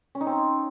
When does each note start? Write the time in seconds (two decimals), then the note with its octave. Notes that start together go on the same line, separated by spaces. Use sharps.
0.15 C#4
0.21 D#4
0.27 C4
0.32 C#5